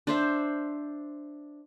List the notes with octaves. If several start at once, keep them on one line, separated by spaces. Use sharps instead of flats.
D4 C5 E5